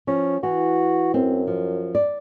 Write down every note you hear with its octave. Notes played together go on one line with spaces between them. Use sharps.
F3 C#4
E3 F#4
F#2 C4
F3
D5